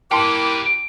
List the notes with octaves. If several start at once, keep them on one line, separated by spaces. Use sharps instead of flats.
A#3 E4 G4 B4 G5 A5 C6 D6